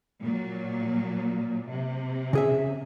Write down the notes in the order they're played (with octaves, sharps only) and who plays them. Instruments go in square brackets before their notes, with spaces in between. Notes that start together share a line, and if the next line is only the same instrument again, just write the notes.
[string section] A#2 F#3
C3
[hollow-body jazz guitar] C#3 G#4 E5